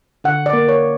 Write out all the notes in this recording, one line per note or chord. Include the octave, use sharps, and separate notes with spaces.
D3 F#5
D5
A#3
C#5